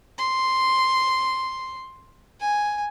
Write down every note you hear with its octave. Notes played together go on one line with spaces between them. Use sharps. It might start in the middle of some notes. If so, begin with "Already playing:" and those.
C6
G#5